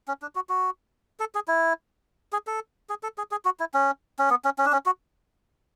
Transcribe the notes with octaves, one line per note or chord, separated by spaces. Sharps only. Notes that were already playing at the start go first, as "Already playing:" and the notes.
C#4
D4
F#4
F#4
A4
G#4
E4
G#4
A4
G#4
A4
G#4
G#4
F#4
E4
C#4
C#4
B3
C#4
C#4
D4
C#4
F#4